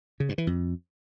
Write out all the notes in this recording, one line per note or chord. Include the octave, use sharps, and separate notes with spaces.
C#3
G2
E3
F2